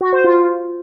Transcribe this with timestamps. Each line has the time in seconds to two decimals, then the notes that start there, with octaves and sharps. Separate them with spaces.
0.01 F#4
0.13 C5
0.24 F4